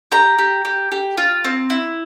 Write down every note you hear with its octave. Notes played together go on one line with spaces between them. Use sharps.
G4 A#5
G4
G4
G4
F4
C4
E4